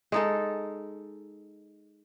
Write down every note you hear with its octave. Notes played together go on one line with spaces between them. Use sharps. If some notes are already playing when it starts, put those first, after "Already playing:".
G#3 D#4 A4